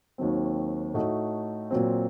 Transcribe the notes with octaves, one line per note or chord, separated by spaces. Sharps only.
D#2 D#3 F#3 C4
A2 A3 D#4 F#4
A#2 F#3 C4